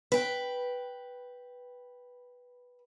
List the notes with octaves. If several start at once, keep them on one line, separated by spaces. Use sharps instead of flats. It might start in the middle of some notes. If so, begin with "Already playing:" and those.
B4 G5